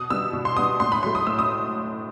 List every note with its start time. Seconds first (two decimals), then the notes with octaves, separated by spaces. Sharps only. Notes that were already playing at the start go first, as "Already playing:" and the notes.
Already playing: B2 D#6
0.10 G3 B3 E6
0.33 B2
0.45 C6
0.57 G3 B3 D#6
0.80 A2 C6
0.92 B5
1.03 F#3 A3 C6
1.15 D#6
1.27 A2 E6
1.39 D#6